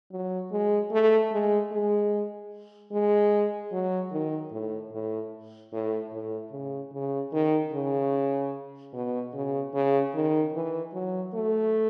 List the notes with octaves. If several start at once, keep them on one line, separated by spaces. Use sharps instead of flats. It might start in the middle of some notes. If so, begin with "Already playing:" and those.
F#3
G#3
A3
G#3
G#3
G#3
F#3
D#3
A2
A2
A2
A2
C#3
C#3
D#3
C#3
B2
C#3
C#3
D#3
E3
F#3
A3